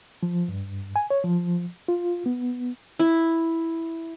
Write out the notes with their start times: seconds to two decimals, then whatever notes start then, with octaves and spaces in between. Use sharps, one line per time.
0.23 F3
0.48 G2
0.96 G#5
1.10 C#5
1.24 F3
1.88 F4
2.26 B3
2.99 E4